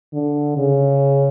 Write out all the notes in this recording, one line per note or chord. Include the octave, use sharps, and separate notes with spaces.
D3
C#3